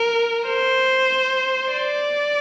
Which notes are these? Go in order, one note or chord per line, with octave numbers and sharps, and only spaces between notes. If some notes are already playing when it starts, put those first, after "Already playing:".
Already playing: A#4
C5
D5